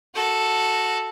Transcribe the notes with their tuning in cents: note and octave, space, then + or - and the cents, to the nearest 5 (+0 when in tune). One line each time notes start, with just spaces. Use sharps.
F#4 +0 A4 +0